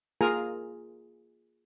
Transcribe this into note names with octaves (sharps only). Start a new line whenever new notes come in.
A#3 F4 G#4 A#4 G#5 A#5